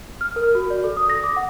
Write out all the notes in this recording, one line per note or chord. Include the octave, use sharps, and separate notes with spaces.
F6
A#4
F#4
D5
A4
D#6
A#6
D6
F#5